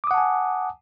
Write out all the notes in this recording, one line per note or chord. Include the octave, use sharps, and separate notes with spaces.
F#5 G#5 A5 D6 D#6